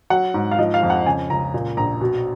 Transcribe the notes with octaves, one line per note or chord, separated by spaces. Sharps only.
F#3 F#5
G#2
F5
F3 D#5
F5
F2
F#5
C#3 G#5
C#2 A#5
A#2
A#1 A#5
B2